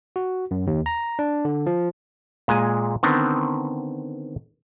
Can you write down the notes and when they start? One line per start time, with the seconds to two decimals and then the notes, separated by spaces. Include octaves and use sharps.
0.16 F#4
0.51 F#2
0.67 D#2
0.86 A#5
1.19 D4
1.45 D3
1.66 F3
2.48 A#2 G#3 G#5
3.03 D3 D#3 B3 C4